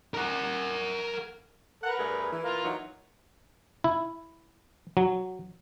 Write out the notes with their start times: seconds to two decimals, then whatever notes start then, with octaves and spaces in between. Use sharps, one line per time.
0.14 A#4 F#5
1.84 A#4 B4 F#5
1.98 G2 A3 G#4
2.31 E3
2.45 F4 A#4 F5
2.63 E3 F#3 D#4
3.84 E4
4.97 F#3